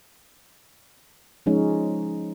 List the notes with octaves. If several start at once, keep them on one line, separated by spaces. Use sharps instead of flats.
F3 G#3 C#4 D#4